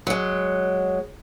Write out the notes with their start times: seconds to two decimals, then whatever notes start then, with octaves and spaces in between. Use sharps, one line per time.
0.07 F#3 G#3